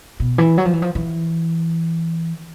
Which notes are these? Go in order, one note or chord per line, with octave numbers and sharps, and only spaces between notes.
B2
E3
F#3
F3
E3
F3
E3